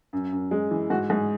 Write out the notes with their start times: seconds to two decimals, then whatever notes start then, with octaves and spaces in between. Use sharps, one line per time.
0.13 F#2
0.32 F#2
0.51 G#3
0.71 E3
0.90 G#2 F#4
1.10 G#2 G#4